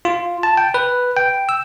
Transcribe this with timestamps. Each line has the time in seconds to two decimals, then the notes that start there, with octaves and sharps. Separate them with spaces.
0.05 F4
0.43 A5
0.57 G5
0.74 B4
1.17 G5
1.49 E6